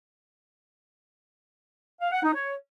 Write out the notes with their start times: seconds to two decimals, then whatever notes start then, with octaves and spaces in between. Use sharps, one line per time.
2.01 F5
2.12 F#5
2.23 D#4
2.34 C#5